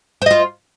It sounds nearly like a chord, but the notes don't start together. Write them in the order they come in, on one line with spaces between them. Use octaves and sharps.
C5 D#5 F4